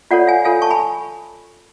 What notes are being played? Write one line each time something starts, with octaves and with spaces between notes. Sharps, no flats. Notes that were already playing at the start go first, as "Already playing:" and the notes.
F4 A4 C#5 D5 F#5
F5 G#5
F4 A4 C#5 F5 G#5
A5 C#6
G#5 B5